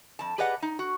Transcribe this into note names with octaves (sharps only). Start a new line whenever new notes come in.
F2 A5
G4 G#4 B4 D5 D#5 F#5
D#4
F#4